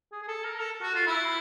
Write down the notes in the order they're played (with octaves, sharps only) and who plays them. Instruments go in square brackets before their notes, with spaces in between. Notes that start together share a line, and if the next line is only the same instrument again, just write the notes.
[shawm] G#4
G#4
A4
A#4
A4
F#4
F4
E4